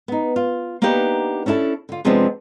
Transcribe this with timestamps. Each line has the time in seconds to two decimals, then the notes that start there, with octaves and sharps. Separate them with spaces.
0.08 B3 D#4
0.36 F4
0.82 A#3 B3 D4 D#4 G4 B4
1.46 C#4 D4 E4 F#4 A4
1.89 D3 F4
2.05 C3 F3 G#3 B3 C4 D4